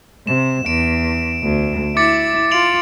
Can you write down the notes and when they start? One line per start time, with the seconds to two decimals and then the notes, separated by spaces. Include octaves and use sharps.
0.27 C3 E7
0.66 E2 D7
1.43 D2
1.97 E4 D6 A6 C#7
2.51 F4 D7 F7 F#7